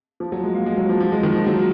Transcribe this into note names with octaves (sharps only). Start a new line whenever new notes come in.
F3
F#3
G#3
A#3
G#3
F#3
F3
F3
G#3
D#3
F3
F#3